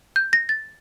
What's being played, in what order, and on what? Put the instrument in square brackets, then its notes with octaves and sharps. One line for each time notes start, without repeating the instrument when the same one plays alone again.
[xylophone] G6
A#6
A6